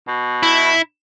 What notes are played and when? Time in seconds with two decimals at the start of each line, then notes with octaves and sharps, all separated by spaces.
0.08 B2
0.43 E4